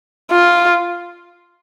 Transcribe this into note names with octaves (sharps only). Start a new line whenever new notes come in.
F4